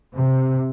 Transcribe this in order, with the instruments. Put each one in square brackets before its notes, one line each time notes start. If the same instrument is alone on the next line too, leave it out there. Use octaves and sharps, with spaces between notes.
[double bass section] C3